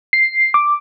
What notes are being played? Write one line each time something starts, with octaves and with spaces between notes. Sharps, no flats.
C7
D6